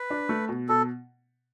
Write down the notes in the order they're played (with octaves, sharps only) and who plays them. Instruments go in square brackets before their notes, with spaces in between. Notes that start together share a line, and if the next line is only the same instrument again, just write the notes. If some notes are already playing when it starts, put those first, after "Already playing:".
Already playing: [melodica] B4
[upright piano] D4
A3
B2
[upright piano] B2 [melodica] A4